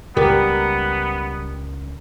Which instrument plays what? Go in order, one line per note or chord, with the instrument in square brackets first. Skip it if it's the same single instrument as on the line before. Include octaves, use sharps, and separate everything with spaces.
[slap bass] C#2 [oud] G3 [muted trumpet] B3 [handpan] A#4